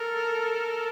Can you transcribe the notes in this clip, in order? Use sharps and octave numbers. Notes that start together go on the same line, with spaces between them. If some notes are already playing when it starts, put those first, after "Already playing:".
Already playing: A4 A#4
A4